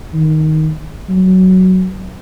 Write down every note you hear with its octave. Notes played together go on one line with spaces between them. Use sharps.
D#3
F#3